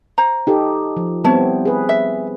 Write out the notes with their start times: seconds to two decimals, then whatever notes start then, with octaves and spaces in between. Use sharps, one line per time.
0.18 C5 A#5
0.47 D#4 G4 A4
0.97 F3
1.24 G3 B3 C4 E4 C#5 A5
1.65 G#4 B4
1.89 E5